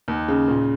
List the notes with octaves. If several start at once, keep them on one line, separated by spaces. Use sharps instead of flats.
D#2
C#3
A#2